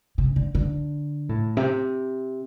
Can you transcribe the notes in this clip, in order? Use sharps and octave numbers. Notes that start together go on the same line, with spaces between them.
C3
D3
D3
A2
C3